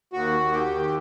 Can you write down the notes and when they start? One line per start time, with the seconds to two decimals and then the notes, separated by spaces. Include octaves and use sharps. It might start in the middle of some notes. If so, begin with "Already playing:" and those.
0.13 D#2 F#4
0.40 D#2
0.53 G4
0.67 D#2